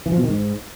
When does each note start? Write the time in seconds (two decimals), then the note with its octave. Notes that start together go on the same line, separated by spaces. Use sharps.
0.06 E3
0.12 F3
0.18 B2
0.23 D#3
0.29 G#2